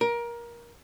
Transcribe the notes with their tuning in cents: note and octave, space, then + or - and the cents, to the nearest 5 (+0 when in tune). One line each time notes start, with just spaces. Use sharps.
A#4 +20